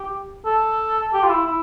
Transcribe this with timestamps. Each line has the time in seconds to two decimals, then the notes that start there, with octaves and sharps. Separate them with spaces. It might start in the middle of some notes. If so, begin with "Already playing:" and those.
Already playing: G4
0.46 A4
1.14 G4
1.23 F4
1.29 E4
1.46 E4